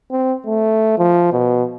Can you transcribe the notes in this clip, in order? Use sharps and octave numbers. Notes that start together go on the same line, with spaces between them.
C4
A3
F3
B2